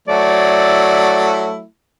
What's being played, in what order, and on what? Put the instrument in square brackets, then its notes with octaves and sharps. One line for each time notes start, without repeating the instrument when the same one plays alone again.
[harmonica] F#3 A3 E4 [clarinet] D5